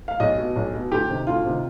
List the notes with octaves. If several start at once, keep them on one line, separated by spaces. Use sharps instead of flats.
F5
B1 D#5
B2
B1
B2
D2 G4
C3 D#3
D2 F4
C3 D#3